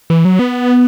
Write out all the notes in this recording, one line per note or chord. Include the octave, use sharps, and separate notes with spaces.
E3
F#3
B3